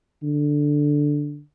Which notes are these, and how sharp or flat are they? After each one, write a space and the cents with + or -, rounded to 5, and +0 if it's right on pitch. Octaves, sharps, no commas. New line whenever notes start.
D3 +0